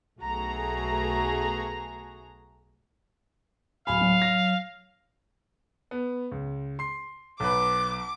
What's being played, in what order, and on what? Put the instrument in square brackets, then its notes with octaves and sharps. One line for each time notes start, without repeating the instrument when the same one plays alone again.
[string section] B1 A3 F#4 G#4 A#5
[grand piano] D1 G#5 B5 [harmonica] F5
[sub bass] F#3
[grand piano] A#6 F7
B3
C#2
C6 C7
[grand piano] B1 B4 [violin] D6